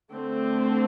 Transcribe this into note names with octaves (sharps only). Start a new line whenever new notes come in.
D3 A3 C4